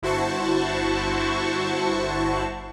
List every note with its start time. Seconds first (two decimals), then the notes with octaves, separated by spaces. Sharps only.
0.02 G1 E4 F#4 C5 A5 C#6